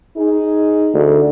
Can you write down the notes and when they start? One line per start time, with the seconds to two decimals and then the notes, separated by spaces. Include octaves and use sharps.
0.17 D#4 G#4
0.94 D2